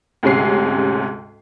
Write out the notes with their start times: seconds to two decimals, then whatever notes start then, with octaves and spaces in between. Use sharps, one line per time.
0.23 D2 G#2 C3 C#4 C7